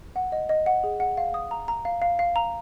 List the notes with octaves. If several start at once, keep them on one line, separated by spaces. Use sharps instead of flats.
F#5
D#5
D#5
F#5
G#4
F#5
F5
D#6
A#5
A#5
F5
F5
F5
A#5